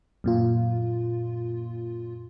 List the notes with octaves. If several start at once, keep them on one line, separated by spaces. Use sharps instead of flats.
F#2 A#2 F4